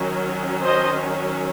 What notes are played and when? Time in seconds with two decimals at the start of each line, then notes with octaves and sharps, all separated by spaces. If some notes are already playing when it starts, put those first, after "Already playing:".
Already playing: D#3 F#3 C#4
0.63 C5 D#5